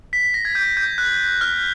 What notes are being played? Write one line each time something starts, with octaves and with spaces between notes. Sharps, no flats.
B6
B6
A#6
G#6
G6
G6
F#6
F6